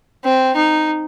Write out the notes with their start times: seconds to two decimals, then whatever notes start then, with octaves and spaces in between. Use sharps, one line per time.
0.24 C4
0.56 D#4